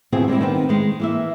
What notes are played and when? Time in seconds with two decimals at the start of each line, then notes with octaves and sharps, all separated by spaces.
0.12 B2 D#3 E3 C4 F4 G#4
0.28 G3 G#3 C4 E4
0.41 D#3 B3 C4
0.69 D#3 G#3
1.00 E3 A#3 E5